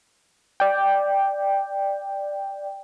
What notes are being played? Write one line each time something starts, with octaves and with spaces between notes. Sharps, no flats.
D5 G5